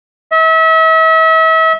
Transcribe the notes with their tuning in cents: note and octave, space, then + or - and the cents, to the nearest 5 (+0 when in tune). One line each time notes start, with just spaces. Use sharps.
E5 -40